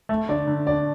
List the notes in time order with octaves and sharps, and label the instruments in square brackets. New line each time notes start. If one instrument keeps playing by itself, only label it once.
[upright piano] A3
[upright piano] D3 [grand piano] D5
[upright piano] D3
[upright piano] D4 [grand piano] D5